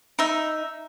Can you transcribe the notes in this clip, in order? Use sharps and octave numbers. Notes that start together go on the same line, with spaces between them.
D#4 E5